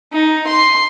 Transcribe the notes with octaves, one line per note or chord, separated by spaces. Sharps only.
D#4
C6